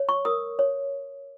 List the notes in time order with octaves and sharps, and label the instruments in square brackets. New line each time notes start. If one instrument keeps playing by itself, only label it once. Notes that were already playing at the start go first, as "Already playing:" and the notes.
Already playing: [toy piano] C#5
C#6
A#4 D#6
C#5